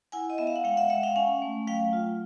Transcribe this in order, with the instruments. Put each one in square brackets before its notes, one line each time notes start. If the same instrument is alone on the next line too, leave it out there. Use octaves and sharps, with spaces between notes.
[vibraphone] E4 F#5 G#5
D#5
B3 E5
F5
F#5
G#3 F5 G5
E5 F#5
G#3 E5 F#5
F5 G5
C#4 F#5 G#5
A3
F#3 F5 G5
F4